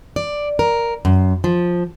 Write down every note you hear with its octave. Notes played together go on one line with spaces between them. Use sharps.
D5
A#4
F#2
F3